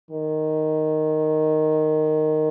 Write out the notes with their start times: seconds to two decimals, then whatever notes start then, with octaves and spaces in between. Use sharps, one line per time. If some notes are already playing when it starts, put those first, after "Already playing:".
0.11 D#3